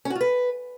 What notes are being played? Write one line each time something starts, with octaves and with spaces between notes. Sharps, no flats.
C#4
F#4
F4
B4